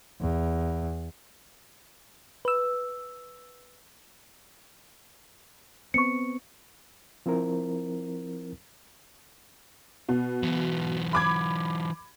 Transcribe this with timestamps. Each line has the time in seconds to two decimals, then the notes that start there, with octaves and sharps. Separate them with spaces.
0.20 E2
2.45 B4 E6
5.94 B3 C4 C#6 C#7
7.26 F3 C4 E4 A#4
10.09 B2
10.43 E3 F#3
11.13 B5 D6 G#6